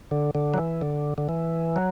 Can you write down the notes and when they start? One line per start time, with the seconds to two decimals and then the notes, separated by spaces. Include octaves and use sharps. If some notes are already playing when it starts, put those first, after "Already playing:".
0.11 D3
0.35 D3
0.54 F#3
0.58 E3
0.81 D3
1.18 D3
1.29 E3
1.76 F#3